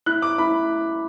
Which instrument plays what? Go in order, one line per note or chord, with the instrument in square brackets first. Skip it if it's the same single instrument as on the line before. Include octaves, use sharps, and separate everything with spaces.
[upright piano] E4 F#6
D6
E4 B5